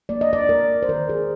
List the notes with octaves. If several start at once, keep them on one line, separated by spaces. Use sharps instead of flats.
A#3 D5
D#5
D5
A#3 A#4
C5
D#3 A#4
G#4